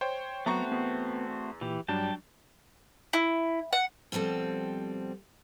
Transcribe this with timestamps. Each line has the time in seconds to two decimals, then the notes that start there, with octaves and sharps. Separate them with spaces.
0.01 C5 C#5 G5
0.46 F#3 A3 B3 C4 F#4 A#5 C#6
0.72 E2 B3
1.61 A#2 E3 G4
1.88 G2 F#3 G3 D4 G5 A5
3.13 E4
3.73 F#5
4.12 B2 F3 G3 C4 A4